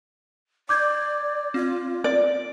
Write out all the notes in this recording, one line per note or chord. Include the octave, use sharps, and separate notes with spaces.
D5 D6 G6 G#6
C4 F4
D5